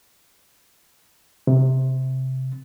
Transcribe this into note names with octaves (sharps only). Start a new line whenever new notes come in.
C3